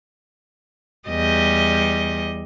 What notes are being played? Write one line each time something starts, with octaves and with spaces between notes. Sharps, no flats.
E2 G3 D#5